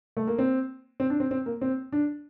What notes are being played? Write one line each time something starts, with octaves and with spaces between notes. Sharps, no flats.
A3
A#3
C4
C4
D4
C4
C4
A#3
C4
D4